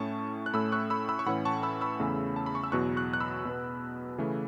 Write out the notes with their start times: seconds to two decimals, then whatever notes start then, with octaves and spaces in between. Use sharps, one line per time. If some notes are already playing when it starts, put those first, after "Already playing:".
Already playing: A2 A3 C#4 A5 C#6
0.46 F#6
0.54 A2 A3 C#4 B5 E6
0.72 C#6 F#6
0.90 B5 E6
1.09 B5 E6
1.19 C#6
1.26 A2 E3 C#4 F#5 B5
1.45 A5 C#6
1.63 B5 E6
1.81 B5 E6
2.00 E2 C#3 A3 C#4
2.36 A5
2.46 B5
2.55 C#6
2.64 E6
2.72 E2 B2 F#3 C#6 F#6
2.97 C#6 F#6
3.13 F#6
3.20 B5 E6
3.45 B2 B3
4.18 C#3 E3 A3